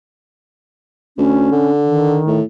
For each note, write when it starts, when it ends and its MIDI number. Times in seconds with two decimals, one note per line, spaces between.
1.18 1.48 38
1.18 1.71 61
1.51 2.21 50
1.83 2.40 51
2.27 2.43 45